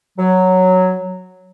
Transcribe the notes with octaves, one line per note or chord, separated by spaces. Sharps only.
F#3